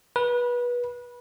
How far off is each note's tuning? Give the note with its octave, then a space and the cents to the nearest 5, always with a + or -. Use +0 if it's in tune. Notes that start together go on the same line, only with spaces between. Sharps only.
B4 -25